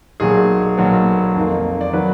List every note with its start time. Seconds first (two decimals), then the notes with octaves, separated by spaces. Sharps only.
0.20 B1 A#2 F#3 G#4
0.77 B1 A#2 F#3 B3
1.35 F2 D#3 A#3
1.81 D5
1.93 D#3 F#3 B3 B4